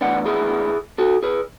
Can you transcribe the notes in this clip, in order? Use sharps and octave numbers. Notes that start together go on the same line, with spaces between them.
A2 E3 B3 D4 D5 F#5
E4 G#4
F#4 A4
G#4 B4